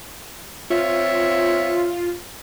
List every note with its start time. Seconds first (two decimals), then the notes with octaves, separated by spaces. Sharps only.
0.70 C4 F4 C#5 E5